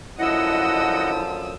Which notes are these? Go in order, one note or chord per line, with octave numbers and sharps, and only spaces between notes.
F#2 D3 F3 E4 D#5 F#5 D#6 E6